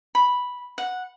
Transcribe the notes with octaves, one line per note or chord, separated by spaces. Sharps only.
B5
F#5